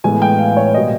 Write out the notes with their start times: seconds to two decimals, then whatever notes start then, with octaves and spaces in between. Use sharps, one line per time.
0.04 A2 E3 G#3 B3 G#5
0.22 G5
0.39 F5
0.57 C#5
0.74 B2 G3 A#3 D#5